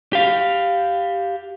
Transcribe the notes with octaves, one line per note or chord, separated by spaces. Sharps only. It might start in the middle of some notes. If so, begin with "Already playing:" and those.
G4 F5